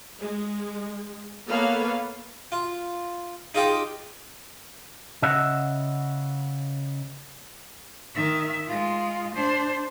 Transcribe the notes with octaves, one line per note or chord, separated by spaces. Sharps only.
G#3
A#3 B3 A4 B4 C#5 F5
F4
D#4 F4 G4 G#4
C#3 D#5 E5 F#5
D#3 E5
G#3 F4
D4 C5